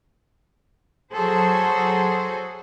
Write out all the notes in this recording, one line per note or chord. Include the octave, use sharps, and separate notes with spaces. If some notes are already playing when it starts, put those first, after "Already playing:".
F#3 F#4 G#4 A4 C5